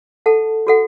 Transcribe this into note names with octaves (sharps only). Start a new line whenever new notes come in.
A4 F#5 A5
F#4 A4 F#5